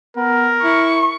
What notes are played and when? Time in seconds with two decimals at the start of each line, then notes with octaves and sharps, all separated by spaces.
0.17 B3 A#4
0.63 E4 C#6